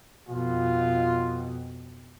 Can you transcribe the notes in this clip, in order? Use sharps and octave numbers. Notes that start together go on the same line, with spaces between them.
F2 B2 F4